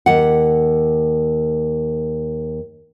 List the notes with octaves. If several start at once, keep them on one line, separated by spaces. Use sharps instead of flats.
D#2 F#5